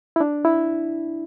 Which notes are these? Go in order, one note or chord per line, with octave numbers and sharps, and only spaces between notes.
E4
D4
E4